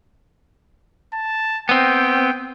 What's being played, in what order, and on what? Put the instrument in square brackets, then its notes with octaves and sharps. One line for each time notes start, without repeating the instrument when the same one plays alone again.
[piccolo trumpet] A5
[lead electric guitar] B3 C4 [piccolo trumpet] G5